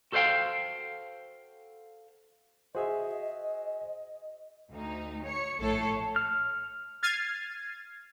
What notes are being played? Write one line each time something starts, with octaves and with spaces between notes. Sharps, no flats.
F#4 A4 C5 D5 F5 G5
F#4 G#4 C5 D#5 E5
D2 D#4
C#5 C#7
A#1 A2 A3 A4 C#5 C7
F6
F6 G#6 A6 C7 D#7